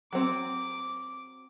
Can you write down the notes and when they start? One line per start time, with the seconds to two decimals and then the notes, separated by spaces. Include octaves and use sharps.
0.13 F#3 C4 D6